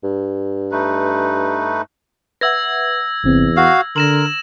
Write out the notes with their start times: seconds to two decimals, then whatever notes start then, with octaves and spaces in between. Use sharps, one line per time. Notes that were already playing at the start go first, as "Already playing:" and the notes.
0.04 G2
0.71 A3 D#4 B4
2.41 B4 E5 F#5 E6 G#6 A#6
3.24 G1 E2 C3 C4
3.57 F#4 F5 F6
3.96 D3 A#4 C6 A#6 E7 F#7